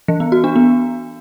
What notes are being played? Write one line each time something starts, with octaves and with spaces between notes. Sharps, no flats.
E3
B3
F#4
D4
B3